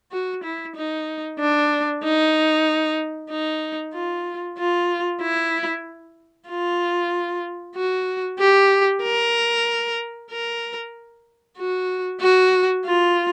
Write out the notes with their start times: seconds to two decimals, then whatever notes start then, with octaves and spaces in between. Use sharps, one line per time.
0.12 F#4
0.44 E4
0.76 D#4
1.39 D4
2.04 D#4
3.30 D#4
3.94 F4
4.58 F4
5.22 E4
6.49 F4
7.76 F#4
8.39 G4
9.03 A#4
10.31 A#4
11.58 F#4
12.21 F#4
12.85 F4